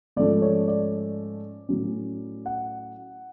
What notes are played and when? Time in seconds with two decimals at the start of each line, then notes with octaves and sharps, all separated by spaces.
0.16 G#2 F3 A3 C#4 D5
0.42 C#5
0.68 D5
1.69 A2 F#3 C#4
2.46 F#5